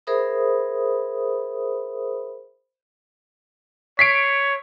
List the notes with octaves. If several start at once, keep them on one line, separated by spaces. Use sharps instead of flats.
G#4 A#4 C5 E5 B5 D#6
C#5 B6 C7 D7